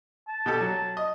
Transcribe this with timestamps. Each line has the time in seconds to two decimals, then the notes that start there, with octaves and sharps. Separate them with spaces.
0.28 A5
0.46 B2 G4 A4
0.61 F#3
0.97 D#5